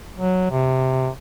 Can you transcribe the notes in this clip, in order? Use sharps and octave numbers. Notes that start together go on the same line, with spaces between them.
F#3
C3